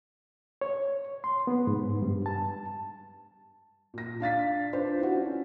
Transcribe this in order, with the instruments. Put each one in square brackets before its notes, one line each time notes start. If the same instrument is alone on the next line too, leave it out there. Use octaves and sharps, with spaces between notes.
[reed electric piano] C#5
C6
B3
G#2
G2
A5
[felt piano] A#2 A#6
D4 F5 A6 B6
D4 F4 B4 C5
E4 F#4
C#4